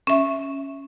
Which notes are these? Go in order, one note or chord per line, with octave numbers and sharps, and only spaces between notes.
C#4 E5